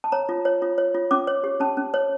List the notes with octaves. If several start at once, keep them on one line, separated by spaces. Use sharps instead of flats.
A5
C#5 A#5
F4
C#5
F4
C#5
F4
C#4 D6
C#5
G4
C#4 A5
C#4
C#5